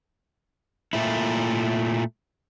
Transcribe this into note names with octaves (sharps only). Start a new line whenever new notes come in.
A#2 A3 E4